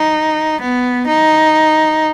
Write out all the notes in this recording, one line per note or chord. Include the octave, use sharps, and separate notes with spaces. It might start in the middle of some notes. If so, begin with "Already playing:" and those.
Already playing: D#4
B3
D#4